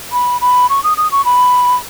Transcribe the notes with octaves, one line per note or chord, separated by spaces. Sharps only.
B5
B5
C#6
D#6
D#6
C#6
B5